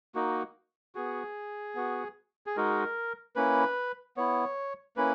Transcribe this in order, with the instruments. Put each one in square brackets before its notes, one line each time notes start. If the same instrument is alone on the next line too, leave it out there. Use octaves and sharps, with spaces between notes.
[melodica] A#3 D#4 F#4
B3 F#4 G#4
B3 F#4
G#4
G#3 D#4 F#4 A#4
A#3 C#4 E4 B4
B3 E4 C#5
A#3 C#4 E4 B4